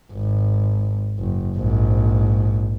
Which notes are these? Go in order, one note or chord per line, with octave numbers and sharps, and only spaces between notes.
G#1
F#1
A#1 G#2